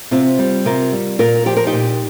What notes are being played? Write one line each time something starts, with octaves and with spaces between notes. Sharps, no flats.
C3 C4 F4
G3
C3 F4 A#4
G3
A#2 F4 A#4
F3 G4
A#4
D#4 G4
A#2